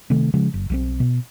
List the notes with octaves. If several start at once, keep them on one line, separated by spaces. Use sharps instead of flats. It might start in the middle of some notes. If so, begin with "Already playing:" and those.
C3 D#3 A3
C#3 F3 G#3
F#1
B1 F3 C4
B2